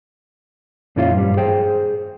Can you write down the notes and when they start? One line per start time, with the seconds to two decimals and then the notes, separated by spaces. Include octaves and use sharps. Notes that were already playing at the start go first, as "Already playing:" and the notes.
0.96 F2 A#2 F3 C#4 E4 F4
1.14 G2 G3
1.37 G#4 C5 G5